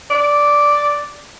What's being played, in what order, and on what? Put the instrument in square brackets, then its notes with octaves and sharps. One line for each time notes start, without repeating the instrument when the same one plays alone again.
[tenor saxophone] D5